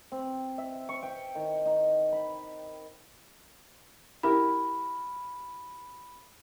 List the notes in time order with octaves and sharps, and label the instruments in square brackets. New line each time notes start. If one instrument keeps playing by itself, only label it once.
[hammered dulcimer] C4
E5
C#6
G5
D#3
D#4
B5
[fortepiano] E4 G4 A#4 [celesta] B5